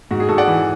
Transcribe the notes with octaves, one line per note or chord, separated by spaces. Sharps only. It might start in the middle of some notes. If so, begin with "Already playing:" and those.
G#2 F#4
G#4
G#2 F#4 A4
D5 F#5
E3